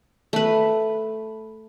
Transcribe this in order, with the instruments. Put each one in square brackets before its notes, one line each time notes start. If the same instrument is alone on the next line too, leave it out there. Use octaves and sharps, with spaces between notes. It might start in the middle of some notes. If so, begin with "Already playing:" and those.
[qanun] A3 B4